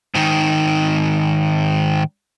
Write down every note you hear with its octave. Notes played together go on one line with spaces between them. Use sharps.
G#2 D#3